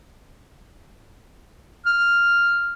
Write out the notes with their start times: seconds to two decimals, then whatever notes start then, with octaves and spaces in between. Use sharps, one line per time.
1.86 F6